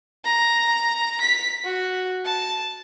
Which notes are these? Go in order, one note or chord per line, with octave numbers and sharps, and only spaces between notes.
A#5
B6
F#4
A5